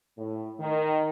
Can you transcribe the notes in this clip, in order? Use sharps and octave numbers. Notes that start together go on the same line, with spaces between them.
A2
D#3